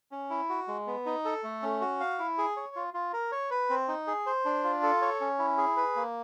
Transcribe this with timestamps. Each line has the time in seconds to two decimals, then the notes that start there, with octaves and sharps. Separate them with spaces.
0.12 C#4
0.30 E4
0.49 F#4
0.68 G#3
0.87 B3
1.06 D#4
1.25 A4
1.44 A3
1.62 C#4
1.81 F#4
2.00 F5
2.19 E4
2.38 G#4
2.57 C#5
2.76 F4
2.94 F4
3.13 A#4
3.32 C#5
3.51 B4
3.70 C4
3.88 D#4
4.07 G#4
4.26 C5
4.45 D4
4.64 F4
4.83 A4
5.02 C#5
5.21 C#4
5.39 E4
5.58 G#4
5.77 B4
5.96 A#3